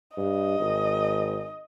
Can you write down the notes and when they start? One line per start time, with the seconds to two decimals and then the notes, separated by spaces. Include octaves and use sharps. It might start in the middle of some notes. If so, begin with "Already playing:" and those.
0.17 G2 D#5
0.60 G#1